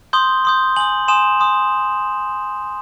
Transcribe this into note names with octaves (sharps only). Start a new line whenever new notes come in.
C6 D#6 G6 G7
C6 D#6 G6
G#5 C6 D#6 F#7
G#5 C6 D#6 E7
G#5 C6 D#6